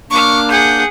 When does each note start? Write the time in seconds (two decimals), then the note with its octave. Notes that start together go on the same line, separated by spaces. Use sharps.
0.11 A#3 D4 C#6 D6 F6
0.50 G#4 F#5 G6